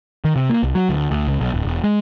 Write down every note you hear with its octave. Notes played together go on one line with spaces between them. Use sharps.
D#3
C3
A#3
C2
F#3
D2
D2
C#2
B1
D1
E1
G#3